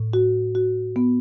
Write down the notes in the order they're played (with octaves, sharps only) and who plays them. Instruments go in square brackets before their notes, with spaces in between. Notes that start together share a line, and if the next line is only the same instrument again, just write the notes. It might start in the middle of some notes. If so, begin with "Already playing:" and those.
Already playing: [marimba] A2
F#4
F#4
B3